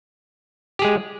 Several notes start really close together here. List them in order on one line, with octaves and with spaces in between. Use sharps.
G4 G#4 G#3